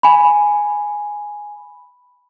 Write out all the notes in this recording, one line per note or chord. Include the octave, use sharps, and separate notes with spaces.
G#5 B5